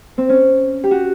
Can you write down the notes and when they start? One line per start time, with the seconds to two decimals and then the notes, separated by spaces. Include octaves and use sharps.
0.18 C4
0.29 C#4
0.84 G4
0.91 F#4